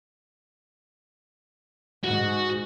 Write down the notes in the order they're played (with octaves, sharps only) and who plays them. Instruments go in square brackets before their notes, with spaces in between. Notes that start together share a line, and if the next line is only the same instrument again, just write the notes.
[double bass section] G#2 [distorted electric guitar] F#4